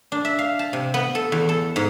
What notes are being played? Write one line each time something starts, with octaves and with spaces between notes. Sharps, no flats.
D4
E5
F5
A5
C3
B3
A4
E2
A4
G#2